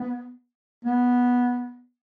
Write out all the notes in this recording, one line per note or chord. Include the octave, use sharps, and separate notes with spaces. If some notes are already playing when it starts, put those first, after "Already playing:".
Already playing: B3
B3